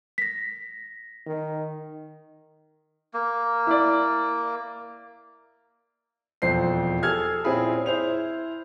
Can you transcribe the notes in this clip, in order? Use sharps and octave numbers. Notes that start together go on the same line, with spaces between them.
A#6 B6
D#3
A#3
E4 D5
E1 F2 C5 C7
G#4 A4 F6 G#6
A#2 C4 C#4 E4 G#4 B5
E4 C5 F7